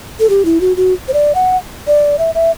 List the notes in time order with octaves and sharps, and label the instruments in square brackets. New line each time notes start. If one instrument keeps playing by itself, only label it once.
[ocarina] A4
G4
E4
F#4
F#4
C5
D5
F#5
D5
E5
E5